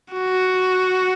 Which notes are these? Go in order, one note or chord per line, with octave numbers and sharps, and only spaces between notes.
F#4